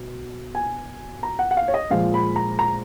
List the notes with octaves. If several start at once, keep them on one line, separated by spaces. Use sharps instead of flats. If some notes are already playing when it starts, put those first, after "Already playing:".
Already playing: B2
G#5
A#5
F#5
F#5
F5
C#5
D#5
A#2 F3 G#3 F5
B5
A#5
A#5